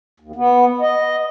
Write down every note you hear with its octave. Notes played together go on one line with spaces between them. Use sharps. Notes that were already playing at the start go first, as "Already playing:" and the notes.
D#2
B3
D#5